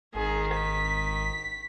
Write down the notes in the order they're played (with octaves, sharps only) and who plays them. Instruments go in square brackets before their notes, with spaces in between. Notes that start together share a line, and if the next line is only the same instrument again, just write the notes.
[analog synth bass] G#1 [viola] D#3 [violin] G#4
[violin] B6